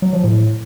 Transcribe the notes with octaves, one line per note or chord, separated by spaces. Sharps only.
F#3
F3
A2